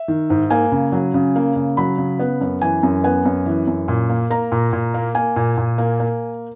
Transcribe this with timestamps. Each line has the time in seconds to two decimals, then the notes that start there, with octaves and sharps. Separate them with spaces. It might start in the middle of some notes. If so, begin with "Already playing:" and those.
Already playing: E5
0.08 D#3
0.30 G#2
0.50 A#3 G#5
0.72 C#3
0.92 F#3
1.14 C#3
1.36 A#3
1.56 C#3
1.77 F#3 B5
1.98 C#3
2.19 B3
2.41 F#2
2.62 E3 G#5
2.83 F#2
3.04 B3 G#5
3.25 F#2
3.46 E3
3.67 F#2
3.88 A#2
4.09 A#3
4.30 A#3 A#5
4.52 A#2
4.73 A#2
4.94 A#3
5.15 A#3 G#5
5.36 A#2
5.57 A#2
5.78 A#3
6.00 A#3